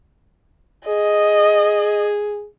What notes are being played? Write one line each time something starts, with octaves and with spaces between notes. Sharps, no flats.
G#4 D#5